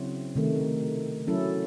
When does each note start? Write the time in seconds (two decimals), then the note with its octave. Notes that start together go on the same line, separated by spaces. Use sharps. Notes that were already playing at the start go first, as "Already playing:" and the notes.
Already playing: C#3 F#3 C4 E4
0.35 C3 D#3 A3
1.27 F#3 C#4 E4 A4